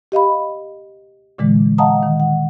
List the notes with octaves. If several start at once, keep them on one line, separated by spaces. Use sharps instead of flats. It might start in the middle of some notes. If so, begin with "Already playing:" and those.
G4 D#5 F5 B5
A#2 D3 E3 G#3
D#5 F5 F#5 A5 A#5 D#6
D#3
F#5